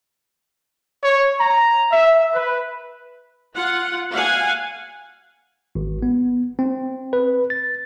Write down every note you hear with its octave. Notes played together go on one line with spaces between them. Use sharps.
C#5
A#5
E5
B4
F4 F#5
F5 F#5 G#5
G#1
B3
C4
B4
A6